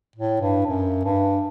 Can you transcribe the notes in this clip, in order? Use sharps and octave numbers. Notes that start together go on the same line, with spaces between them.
A2
G2
F#2
G2